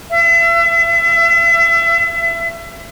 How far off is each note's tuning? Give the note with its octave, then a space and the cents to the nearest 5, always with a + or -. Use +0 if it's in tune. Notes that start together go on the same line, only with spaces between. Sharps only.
E5 +35